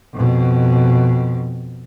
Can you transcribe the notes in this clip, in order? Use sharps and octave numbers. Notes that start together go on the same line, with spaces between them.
F2 B2